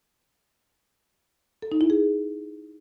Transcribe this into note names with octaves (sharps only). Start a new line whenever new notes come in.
A4
D#4
E4
G#4